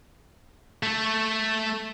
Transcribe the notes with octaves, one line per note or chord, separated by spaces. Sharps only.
A3 A4